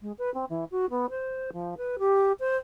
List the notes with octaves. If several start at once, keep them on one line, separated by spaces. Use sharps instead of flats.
G#3
B4
C4
E3
F#4
B3
C5
F3
B4
G4
C5